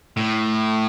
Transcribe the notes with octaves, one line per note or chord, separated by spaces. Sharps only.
A2